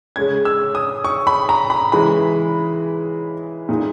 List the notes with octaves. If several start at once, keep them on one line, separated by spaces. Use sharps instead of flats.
C#3 G#3 C#4 G#6
E6
D#6
C#6
B5
A#5
B5
C#3 E3 G#3 B5
A#2 G#3 D#4